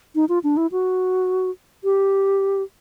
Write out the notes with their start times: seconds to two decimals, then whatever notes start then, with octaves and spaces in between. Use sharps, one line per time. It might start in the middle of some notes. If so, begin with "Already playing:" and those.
0.15 D#4
0.29 F4
0.44 D4
0.57 E4
0.72 F#4
1.84 G4